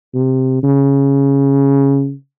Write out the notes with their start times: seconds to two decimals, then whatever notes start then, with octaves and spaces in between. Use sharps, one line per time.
0.14 C3
0.63 C#3